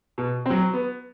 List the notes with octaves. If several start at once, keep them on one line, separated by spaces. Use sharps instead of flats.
B2
F#3 C4
B3